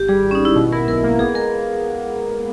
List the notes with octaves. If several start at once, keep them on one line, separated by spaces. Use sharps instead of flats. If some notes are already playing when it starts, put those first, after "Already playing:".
Already playing: G#1 G4
G3 G#4
G#1
C#4
D#4
G#1 E4
B2
E4 A#4
B1 A#4
A#3
B3 G#4
G#3 A#4